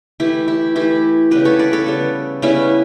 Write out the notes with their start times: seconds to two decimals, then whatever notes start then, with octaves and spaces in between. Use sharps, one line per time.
0.20 E3 A3 E4 G4
0.48 E4 G4
0.75 E3 A3 E4 G4
1.31 C#3 G3 B3 G4 B4
1.45 A4 C#5
1.59 B4 D5
1.73 A4 C#5
1.86 C#3 G3 B3
2.42 C#3 G3 B3 C#4 E4